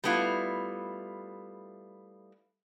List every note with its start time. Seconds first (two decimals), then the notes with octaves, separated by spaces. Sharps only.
0.04 G3 A3 B3 E4 F4